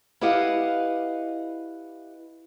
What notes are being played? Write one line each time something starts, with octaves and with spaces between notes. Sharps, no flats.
E4 G4 B4 D#5 F5 F#5